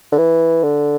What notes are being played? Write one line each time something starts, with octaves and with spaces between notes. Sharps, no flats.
D3
E3
D3